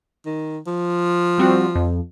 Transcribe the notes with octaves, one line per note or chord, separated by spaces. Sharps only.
D#3
F3
G3 C4 F#4
F2